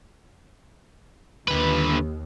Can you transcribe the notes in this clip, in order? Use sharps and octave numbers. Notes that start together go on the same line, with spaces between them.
D#2 D3 B4